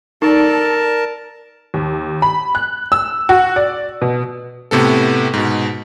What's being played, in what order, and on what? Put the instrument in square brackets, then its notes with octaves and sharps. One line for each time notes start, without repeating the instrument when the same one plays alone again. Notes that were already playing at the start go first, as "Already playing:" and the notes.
[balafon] D#4 [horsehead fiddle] A4 D5 [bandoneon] A#4 A5
[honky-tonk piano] D#2
B5
F#6
E6
F#4
D5
B2
[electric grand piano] A2 C3 B3 A4
G#2 B2